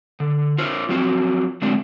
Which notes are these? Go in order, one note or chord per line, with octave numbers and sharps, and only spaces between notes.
D3
F4 A#4 C5 C#5
F3 F#3 C4 F4 F#4
D3 F#3 G#3 A3 C4 D4